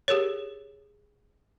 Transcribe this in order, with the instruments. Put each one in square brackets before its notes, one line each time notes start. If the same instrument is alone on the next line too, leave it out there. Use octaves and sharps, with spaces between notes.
[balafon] G4 G#4 A#4 C#5